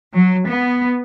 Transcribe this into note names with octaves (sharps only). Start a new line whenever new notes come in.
F#3
B3